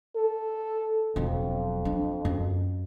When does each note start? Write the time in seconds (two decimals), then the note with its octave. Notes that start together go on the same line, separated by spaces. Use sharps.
0.16 A4
1.16 E1 F2 F#3
1.85 D4
2.25 F#2